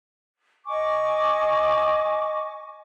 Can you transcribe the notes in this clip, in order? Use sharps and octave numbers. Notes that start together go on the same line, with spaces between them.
D#5 G#5 C#6 D6